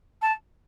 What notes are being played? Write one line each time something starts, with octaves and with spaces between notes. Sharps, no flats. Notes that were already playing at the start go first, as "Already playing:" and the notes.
A5